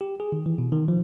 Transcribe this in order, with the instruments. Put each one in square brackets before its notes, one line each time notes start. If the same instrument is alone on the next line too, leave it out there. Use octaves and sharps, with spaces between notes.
[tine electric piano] G4
G#4
D#3
E3
B2
D#3
F3